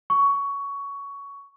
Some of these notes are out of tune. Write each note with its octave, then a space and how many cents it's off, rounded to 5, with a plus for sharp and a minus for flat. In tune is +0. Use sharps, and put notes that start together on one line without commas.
C#6 +15